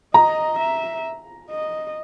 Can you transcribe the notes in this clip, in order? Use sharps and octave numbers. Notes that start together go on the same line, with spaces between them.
D#5 A#5
E5
D#5